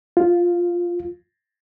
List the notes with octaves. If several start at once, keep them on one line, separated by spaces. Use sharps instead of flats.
F4